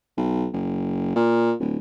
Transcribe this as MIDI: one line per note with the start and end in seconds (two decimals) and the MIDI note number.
0.17 0.47 35
0.53 1.13 30
1.16 1.54 46
1.60 1.78 26